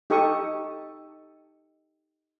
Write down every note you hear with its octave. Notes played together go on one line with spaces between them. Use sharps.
D#4 G4 A4 C#6 D#6